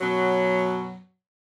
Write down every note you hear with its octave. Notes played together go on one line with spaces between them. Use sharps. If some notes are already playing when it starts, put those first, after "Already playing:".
F#2 B2 F#3